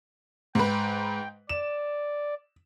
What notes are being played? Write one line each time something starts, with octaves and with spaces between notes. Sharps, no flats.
G#2 B4 G5
D5 E7